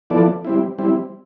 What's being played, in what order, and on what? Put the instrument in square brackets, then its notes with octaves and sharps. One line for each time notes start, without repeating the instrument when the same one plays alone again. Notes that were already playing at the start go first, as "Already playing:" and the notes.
[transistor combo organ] F3 B3 E4 A4 D5
G3 C4 E4
G3 C4 E4